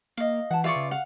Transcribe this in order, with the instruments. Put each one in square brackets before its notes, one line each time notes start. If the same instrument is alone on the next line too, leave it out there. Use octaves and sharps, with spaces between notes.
[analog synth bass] A#3 [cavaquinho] D#5 F5
[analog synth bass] E3 [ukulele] F#5 A5
[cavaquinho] F4 D5 C#6 [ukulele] G#4 B4 E5
[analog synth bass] C#3
[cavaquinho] F5 [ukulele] F#5